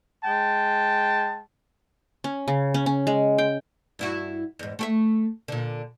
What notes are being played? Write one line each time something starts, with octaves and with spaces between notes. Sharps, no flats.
G#3 G5 A5
C#4
C#3
C#4
C#4
G#3
G5
G2 E4 F#4
E2 G#2
A3 G4 E5
A#2 D3